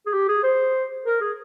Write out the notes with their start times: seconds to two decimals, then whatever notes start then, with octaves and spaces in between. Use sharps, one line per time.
0.06 G#4
0.13 G4
0.28 G#4
0.43 C5
1.06 A#4
1.21 G#4